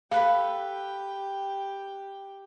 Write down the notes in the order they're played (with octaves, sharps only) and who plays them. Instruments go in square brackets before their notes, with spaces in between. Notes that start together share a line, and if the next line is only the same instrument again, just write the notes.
[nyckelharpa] G4 G5 [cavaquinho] A4 B4 B5 [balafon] F5